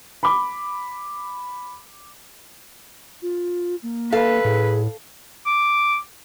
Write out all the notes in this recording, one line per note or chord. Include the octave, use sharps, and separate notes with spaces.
B5 D6
F4
A#3
A4 B4 F5
A2 G#4
D6